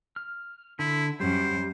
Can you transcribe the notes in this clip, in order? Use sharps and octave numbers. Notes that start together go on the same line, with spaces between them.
F6
D3 E4
F#2 G3 C5